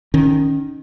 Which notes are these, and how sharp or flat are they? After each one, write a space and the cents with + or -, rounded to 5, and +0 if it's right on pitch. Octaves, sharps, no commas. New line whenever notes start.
D#3 -15 C#4 +0